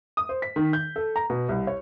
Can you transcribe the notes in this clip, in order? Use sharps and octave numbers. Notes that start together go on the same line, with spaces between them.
D#6
C5
B6
D#3
G6
A4
A#5
B2
C2
C#5